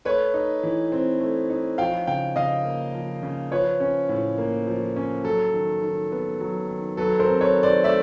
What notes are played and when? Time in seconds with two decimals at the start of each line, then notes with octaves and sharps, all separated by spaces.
0.05 A3 B4 C#5
0.34 D#4
0.63 E3
0.92 C4
1.20 A3
1.50 D#4
1.78 F3 F5 G5
2.07 C#3 F5 G5
2.36 C#3 D#5 F5
2.65 A#3
2.94 F3
3.23 C#3
3.51 F3 B4 C#5
3.80 C#4
4.09 A2
4.38 A#3
4.67 F3
4.96 C#4
5.24 F#3 A4
5.53 D#3
5.82 D#3
6.12 B3
6.41 F#3
6.68 D#3
6.97 F#3 A4 B4
7.19 A#4 C5
7.27 C4
7.41 B4 C#5
7.55 D#3
7.63 C5 D5
7.84 A3 D5 E5